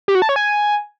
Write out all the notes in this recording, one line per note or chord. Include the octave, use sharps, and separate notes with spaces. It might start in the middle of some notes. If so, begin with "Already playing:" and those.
G4
F#4
A5
C#5
G#5